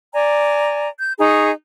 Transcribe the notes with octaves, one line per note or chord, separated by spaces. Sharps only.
D5 G#5 A#5
G6
D#4 G#4 A#5 C#6